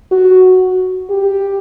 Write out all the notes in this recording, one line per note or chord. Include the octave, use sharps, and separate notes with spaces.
F#4
G4